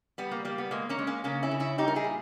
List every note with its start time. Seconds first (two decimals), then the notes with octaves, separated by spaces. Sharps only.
0.18 G3 B3
0.31 A#3
0.45 G3 A#3
0.58 B3
0.71 G#3 A#3
0.89 A#3 C#4
0.99 G#3
1.07 A#3 C#4
1.24 C#3 A#3 C#4
1.43 C#4 E4
1.51 C#3
1.60 C#4 E4
1.78 G3 D#4 G4
1.88 A#4
1.95 E4 G#4
2.04 A#2